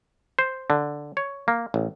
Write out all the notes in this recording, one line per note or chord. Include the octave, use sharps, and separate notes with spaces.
C5
D3
C#5
A#3
A1